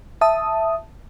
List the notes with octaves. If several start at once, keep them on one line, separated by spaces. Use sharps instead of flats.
E5 A5 D#6